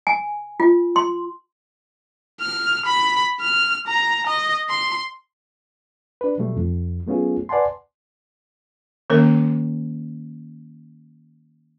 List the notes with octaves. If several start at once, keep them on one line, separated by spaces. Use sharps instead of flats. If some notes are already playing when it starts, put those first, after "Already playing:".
G#5
F4
C6
F6
B5
F6
A#5
D#5
C6
D4 B4
B2 F#3 G3 A3
F2
F#3 A3 B3 C#4 F4 G#4
B4 D5 F#5 G#5 A5 C6
D#3 A#3 C#4 A#4